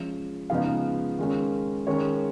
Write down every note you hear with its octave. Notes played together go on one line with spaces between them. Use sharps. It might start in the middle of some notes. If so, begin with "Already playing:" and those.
Already playing: F3 G#3 C#4
C#3 F3 G#3 B3 D#4 F5
D#3 G#3 C#4
D#3 G#3 C#4 C#5